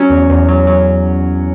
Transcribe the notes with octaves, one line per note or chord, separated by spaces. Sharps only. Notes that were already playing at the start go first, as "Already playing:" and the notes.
Already playing: F#3 C#4
E2
E2
F#3
F#3